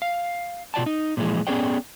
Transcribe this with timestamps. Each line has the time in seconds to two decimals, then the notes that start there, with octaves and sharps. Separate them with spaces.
0.02 F5
0.74 B2 F4 D5 G5 A5
0.86 D#4
1.17 A#2 E3 F3 G#3
1.47 B3 C#4 G#4 C#5 D5 G5